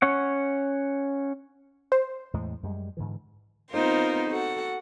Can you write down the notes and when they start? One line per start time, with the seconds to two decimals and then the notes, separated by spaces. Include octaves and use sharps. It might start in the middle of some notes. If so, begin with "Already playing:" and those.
0.02 C#4 C#5 F#5
1.92 C5
2.34 E2 A2 G#3
2.63 F#2 G3 G#3
2.97 G#2 D3 E3
3.71 B3 C4 D#4 F4 A#4 C5
4.30 F#4 A4 F#5